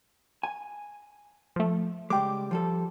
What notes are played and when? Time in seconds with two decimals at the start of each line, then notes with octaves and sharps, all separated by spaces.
0.43 G#5
1.56 F3 A3
2.10 C#3 G3 G#3 G5 D6
2.51 F3 G3 A4